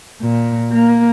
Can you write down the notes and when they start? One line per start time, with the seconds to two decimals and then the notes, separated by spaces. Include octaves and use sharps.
0.21 A#2
0.72 A#3